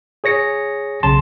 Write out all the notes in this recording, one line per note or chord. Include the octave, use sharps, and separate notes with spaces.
G#4 C#5 A#6 C#7
B1 C#3 A5 C6